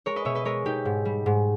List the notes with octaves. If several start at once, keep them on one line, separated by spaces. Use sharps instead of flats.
G#3 A#4 C#5
B4 D#5
B2 C#5 E5
B4 D#5
G#3 A#4 C#5
B2 D#4 G4
G#2
G3
G#2